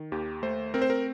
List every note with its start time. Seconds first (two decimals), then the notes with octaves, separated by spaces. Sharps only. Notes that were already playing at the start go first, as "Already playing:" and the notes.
Already playing: D#3
0.12 D#2 G4
0.43 A3 C5
0.74 C4 A#4
0.82 C5
0.90 A#4